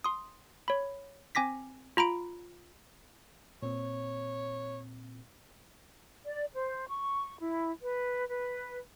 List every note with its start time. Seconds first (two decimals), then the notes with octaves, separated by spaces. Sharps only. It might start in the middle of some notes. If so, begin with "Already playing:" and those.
0.04 C6 D#6
0.68 C#5 B5
1.35 C4 G#5 D6 A#6 B6
1.97 F4 A#5 B5 D7
3.62 A#2 C4 C#5
6.26 D5
6.54 C5
6.89 C#6
7.40 E4
7.82 B4
8.28 B4